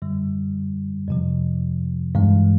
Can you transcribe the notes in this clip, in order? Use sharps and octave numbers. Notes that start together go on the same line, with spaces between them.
F#2 D3 G3
F2 C3 F3
G2 E3 G#3